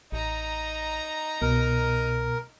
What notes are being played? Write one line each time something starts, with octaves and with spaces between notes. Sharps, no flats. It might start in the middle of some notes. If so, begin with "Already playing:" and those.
A1 D#4 A#5
C2 B2 A#4